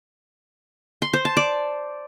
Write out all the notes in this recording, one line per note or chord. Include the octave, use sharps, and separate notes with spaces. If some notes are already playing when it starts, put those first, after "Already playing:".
C6
C5
A5
D5